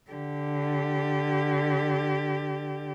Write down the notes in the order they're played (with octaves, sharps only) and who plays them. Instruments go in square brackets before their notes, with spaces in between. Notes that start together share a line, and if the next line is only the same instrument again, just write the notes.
[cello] D3 G4